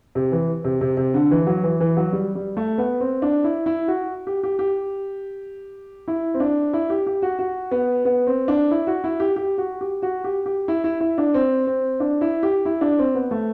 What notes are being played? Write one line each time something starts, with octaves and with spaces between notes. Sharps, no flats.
C3
E3
C3
C3
C3
D3
E3
F#3
E3
E3
F#3
G3
G3
A3
B3
C4
D4
E4
E4
F#4
G4
G4
G4
E4
C4
D4
E4
G4
G4
F#4
F#4
B3
B3
C4
D4
E4
F#4
E4
G4
G4
F#4
G4
F#4
G4
G4
E4
E4
E4
D4
C4
C4
D4
E4
G4
E4
D4
C4
B3
A3